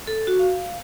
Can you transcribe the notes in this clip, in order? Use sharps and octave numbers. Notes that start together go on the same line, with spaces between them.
A4
F#4
F5